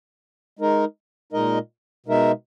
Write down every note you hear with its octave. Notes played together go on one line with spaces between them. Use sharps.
G#3 D#4 A#4
A#2 G#3 D#4 A#4 D#5
B2 G#3 D#4 A#4 E5